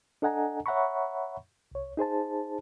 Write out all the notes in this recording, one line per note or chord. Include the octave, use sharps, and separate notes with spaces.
D4 A4 D#5 F#5 G#5 A#5
C#5 E5 F#5 A#5 B5 C#6
C2 C#5
D#4 G#4 C5 A5